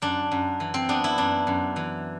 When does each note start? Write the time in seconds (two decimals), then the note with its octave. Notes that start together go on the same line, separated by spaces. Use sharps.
0.02 F#2 D4
0.31 F#2
0.60 E3
0.74 C4
0.89 B3 D4
1.04 E4
1.18 F#2 D4
1.47 F#2
1.76 E3